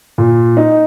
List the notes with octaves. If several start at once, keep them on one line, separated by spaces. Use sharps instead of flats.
A#2
D#4